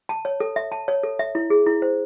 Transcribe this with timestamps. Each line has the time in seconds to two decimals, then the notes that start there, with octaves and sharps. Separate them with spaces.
0.09 A5
0.25 C#5
0.40 A4
0.56 E5
0.72 A5
0.88 C#5
1.03 A4
1.19 E5
1.35 E4
1.50 G#4
1.67 E4
1.82 C5